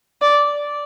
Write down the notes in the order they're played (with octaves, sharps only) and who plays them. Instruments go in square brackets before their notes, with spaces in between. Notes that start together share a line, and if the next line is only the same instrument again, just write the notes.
[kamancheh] D5